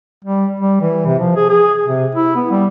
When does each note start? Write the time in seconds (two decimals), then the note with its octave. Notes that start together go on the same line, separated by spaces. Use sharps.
0.24 G3
0.60 G3
0.81 E3
1.06 C3
1.19 F3
1.36 G#4
1.49 G#4
1.86 C3
2.15 E4
2.35 B3
2.51 G3